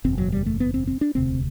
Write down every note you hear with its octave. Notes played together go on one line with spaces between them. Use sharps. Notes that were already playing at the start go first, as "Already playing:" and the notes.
F#1 E2 B2 C4
F#3
G3
A3
B3
C4
C4
D4
E1 D2 C3 C4